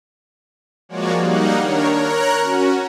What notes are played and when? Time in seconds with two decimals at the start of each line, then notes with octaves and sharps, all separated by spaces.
0.89 F3 G#3 A#3 F#4 C#5 D5
1.20 G3 A#3 D#4 F#5
1.58 D#3 D4 A#4 C#5
1.92 A#4 C#5 A#5 F#6
2.40 C#4 F#4